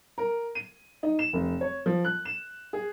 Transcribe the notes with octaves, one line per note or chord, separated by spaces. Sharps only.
A#4
D#7
D#4
E7
F1
C#5
F3
F#6
E7
G#4